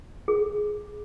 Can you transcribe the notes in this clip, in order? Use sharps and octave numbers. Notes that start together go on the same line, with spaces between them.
G#4